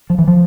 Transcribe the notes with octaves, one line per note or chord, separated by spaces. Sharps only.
F3
E3
F3